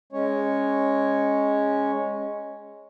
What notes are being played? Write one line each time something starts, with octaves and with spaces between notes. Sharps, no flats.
G#3 C#4 C#5